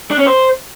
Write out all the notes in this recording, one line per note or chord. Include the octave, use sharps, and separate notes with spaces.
D4
C#4
C5